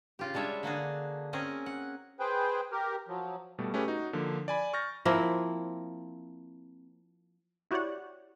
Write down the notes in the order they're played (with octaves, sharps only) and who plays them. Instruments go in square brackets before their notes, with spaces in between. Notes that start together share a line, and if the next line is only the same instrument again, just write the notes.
[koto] C#3 F4 G4
G3 G#3 D4 C#5 E5
D3 A#3 F#4 G#4
C4 C#4 G#4 A#4
F#5
[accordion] G#4 B4 C5 G5
G4 A#4
F3 F#3
[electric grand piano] B2 G3 A3
A3 C#4 G4 G#4 B4
D#4 F#4
D3 F3 A#3
D5 G#5 B5
C#6 F6 G6 A6 A#6
[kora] F3 A#3 C4 E4
[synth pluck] E4 F#4 G4 C#5 D5 F#5